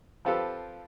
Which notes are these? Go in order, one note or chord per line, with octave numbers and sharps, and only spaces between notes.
F3 C4 F4 G4 A4 B4